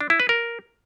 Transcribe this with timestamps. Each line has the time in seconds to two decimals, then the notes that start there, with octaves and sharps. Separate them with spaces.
0.01 D4
0.10 E4
0.20 B4
0.29 A#4